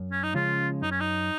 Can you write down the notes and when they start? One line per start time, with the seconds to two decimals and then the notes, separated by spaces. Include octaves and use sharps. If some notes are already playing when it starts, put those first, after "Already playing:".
Already playing: F#2
0.11 C#4
0.23 D#4
0.34 C#3 F3 G#3 C#4 F4
0.82 F#2 D#4
0.91 C#4
1.00 D#4